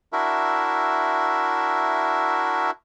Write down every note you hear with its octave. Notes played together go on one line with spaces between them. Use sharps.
D4 E4 F#4 A#4 E5